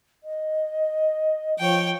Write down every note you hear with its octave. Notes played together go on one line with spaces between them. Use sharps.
D#5
F3 C#5 G5